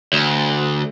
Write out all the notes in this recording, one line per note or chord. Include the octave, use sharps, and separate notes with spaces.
D2